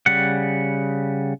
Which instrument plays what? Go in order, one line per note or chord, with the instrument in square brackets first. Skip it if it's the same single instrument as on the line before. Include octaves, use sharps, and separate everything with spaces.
[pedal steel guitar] C#3 G3 F#5